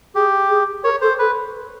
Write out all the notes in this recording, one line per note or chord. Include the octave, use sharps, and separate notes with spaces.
G4 G#4
G#4
A#4 C#5
A4 C5
A4 B4